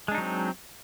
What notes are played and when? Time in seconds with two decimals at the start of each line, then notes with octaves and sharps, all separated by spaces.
0.08 G#3
0.11 D4
0.15 D#4
0.18 F#3
0.21 C4